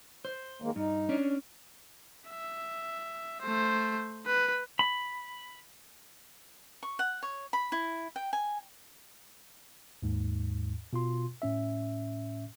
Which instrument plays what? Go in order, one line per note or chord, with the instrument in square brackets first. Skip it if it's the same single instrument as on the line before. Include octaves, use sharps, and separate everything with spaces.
[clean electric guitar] C5
[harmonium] D#3 G#3 A#3
[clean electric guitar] G2 [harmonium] D#4
[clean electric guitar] C#4 D4
[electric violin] E5
A3 C5
B4
[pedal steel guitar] B5
[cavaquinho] C#6
F#5
C#5
B5
E4
G5
G#5
[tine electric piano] D#2 G#2
B2 F4 C6
A2 C#4 E5